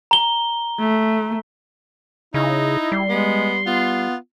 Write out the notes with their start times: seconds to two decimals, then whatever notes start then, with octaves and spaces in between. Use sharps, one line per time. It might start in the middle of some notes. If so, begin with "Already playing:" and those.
0.11 A#5 G7
0.79 A3
2.34 C#3 D#4 E4 D#5
2.92 G3 C6
3.10 G#3 B3
3.67 B3 F4